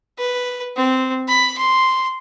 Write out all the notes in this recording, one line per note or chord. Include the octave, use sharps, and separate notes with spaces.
B4
C4
B5
C6